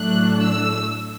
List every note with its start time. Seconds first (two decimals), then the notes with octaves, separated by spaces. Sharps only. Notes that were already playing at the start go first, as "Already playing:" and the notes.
Already playing: A2 F#3 A3 D4 F#6
0.41 E6